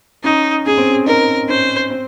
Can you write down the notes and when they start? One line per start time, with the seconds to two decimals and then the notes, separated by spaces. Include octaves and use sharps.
0.24 C#4 D#4
0.66 C#4 G#4
0.78 C4
0.89 C#4
1.06 D#4 A#4
1.49 C#4 C5
1.90 C4